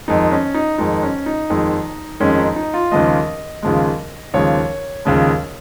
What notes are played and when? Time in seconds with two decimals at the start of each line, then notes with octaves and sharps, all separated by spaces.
0.08 F2 D#3 G#3 D#4
0.32 C#4
0.54 D#4
0.78 F2 D#3 G#3 D#4
1.03 C#4
1.26 D#4
1.50 F2 D#3 G#3
2.20 F2 D#3 G#3 C#4
2.38 D#4
2.56 D#4
2.74 F4
2.92 D#2 C#3 F3 G#3 D#5
3.63 D#2 C#3 F3 G#3
4.34 D#2 C#3 F3 G#3 C#5
5.05 D#2 C#3 F3 G#3